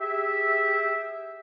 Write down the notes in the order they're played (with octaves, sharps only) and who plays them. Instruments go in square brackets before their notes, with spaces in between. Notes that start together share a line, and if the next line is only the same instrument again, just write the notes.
[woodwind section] G4 G#4 E5